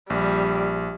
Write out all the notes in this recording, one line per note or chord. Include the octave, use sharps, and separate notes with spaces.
A#1 G3